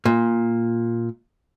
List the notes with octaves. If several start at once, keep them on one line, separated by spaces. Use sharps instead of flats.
A#2